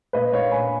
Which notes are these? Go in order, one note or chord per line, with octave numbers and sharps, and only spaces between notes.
A#2 B4 D#5
A#2 C#5 F5
A#2 G#5 B5